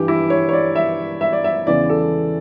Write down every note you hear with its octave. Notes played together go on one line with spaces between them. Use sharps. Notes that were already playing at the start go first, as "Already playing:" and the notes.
Already playing: G2 E3 G4
E4
C#5
C#5
D5
E5
E5
D5
E5
E2 C#3 E3 D5
A4